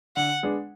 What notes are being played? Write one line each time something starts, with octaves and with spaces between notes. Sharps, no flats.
D3 F#5
G#3 B3 D4